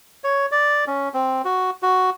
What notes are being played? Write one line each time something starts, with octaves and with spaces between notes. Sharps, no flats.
C#5
D5
C#4
C4
F#4
F#4